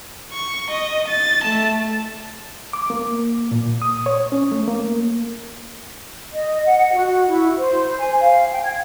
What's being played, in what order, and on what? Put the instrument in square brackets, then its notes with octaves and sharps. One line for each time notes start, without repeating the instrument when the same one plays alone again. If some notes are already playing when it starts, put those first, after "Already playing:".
[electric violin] C#6
D#5
A6
A3 A5
[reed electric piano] D6
A#3
A#2
D#6
C#5
C#4
A3
A#3
[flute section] D#5
F#5
F#4
E4
C5
G#5
F5
G5
G#6